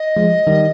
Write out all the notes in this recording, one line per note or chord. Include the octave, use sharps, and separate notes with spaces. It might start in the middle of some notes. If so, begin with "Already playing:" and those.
Already playing: D#5
F3 G#3
D#3 G3